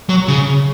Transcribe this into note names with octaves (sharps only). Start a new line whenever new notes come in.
F#3
C#3